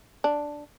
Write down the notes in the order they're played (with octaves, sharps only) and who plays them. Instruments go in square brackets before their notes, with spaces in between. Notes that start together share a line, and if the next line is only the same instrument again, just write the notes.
[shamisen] D4